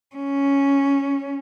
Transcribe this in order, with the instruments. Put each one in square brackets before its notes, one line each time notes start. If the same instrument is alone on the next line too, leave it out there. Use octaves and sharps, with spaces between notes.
[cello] C#4